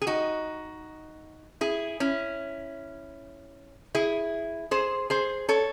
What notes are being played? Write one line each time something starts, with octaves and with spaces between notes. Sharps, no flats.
G#4
D#4 F#4
E4 G#4
C#4 E4
E4 G#4
G#4 C5
G#4 C5
A4 C#5